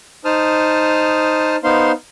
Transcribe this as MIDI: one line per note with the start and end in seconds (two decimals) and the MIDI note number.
0.25 1.56 63
0.25 1.56 72
0.25 1.56 81
0.25 1.56 87
0.25 1.56 89
1.64 1.92 59
1.64 1.92 63
1.64 1.92 72
1.64 1.92 77
1.64 1.92 84